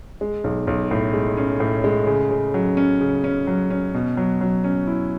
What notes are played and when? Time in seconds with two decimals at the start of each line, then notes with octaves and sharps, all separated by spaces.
0.21 G#3
0.44 B1
0.67 B1
0.91 A2
1.14 G#3
1.37 C#4
1.60 A2
1.84 G#3
2.07 C#3
2.31 C#3
2.54 F#3
2.77 C#4
3.01 C#3
3.24 C#4
3.47 F#3
3.70 C#4
3.94 B2
4.17 F#3
4.41 F#3
4.64 C#4
4.87 E4